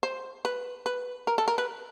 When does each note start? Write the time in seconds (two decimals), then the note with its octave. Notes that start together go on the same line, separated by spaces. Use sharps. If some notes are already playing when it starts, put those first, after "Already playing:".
0.03 C5
0.45 B4
0.86 B4
1.27 A#4
1.38 A4
1.48 A#4
1.58 B4